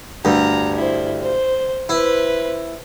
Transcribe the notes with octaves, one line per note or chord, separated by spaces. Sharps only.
D2 G2 A#5
E4 C5
C5
E4 B4 C5